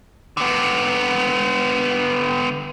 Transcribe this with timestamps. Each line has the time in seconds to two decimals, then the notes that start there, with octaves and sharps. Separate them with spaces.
0.37 D3 B3